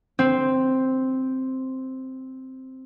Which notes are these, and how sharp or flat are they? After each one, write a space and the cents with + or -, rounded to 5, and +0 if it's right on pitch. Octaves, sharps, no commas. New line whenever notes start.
C4 +0